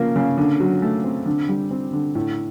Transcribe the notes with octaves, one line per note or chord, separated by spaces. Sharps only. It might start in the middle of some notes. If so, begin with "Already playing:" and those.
Already playing: C#3 F3 A#3
C#3
D3
F#3
A3
C4
D3
G3
C4
D3
A2